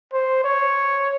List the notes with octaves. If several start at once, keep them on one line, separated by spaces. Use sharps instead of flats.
C5
C#5